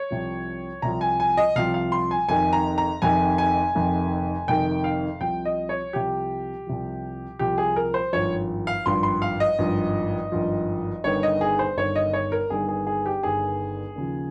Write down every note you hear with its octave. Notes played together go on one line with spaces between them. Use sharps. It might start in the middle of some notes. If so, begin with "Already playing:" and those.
Already playing: C#5
C2 C3 F3
C2 C3 F3 A#5
G#5
G#5
D#5
C2 C3 F3 F5
F5
C6
G#5
F1 F2 C3 D#3 G#5
A#5
A#5
F1 F2 C3 D#3 G#5
G#5
F1 F2 C3 D#3
F1 F2 C3 D#3 G5
F5
C2 C3 F3 G5
D#5
C#5
C2 C3 F3 G4
C2 C3 F3
C2 C3 F3 G4
G#4
A#4
C5
G#1 G2 F3 C#5
F5
G#1 G2 F3 C6
C6
F5
D#5
G#1 G2 F3
G#1 G2 F3
G1 G2 D#3 C#5
D#5
G#4
C5
G1 G2 D#3 C#5
D#5
C#5
A#4
G1 G2 D#3 G#4
G#4
G#4
G4
G1 G2 D#3 G#4
D#2 C#3 F3